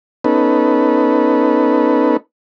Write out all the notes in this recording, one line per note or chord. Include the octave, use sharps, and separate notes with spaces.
B3 C#4 D#4 A4 B4